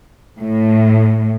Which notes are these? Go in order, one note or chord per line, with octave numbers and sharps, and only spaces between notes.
A2